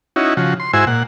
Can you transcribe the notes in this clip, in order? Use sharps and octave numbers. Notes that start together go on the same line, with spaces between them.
C#4 D#4 E4 F#4
C#3 F3 F#4
C6
G#2 E4 F#4 C5 G#5 E6
A#2 F#5